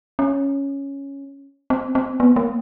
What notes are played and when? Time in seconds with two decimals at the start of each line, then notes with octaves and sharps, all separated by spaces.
0.19 C#4
1.70 C4
1.95 C4
2.20 B3
2.36 A#3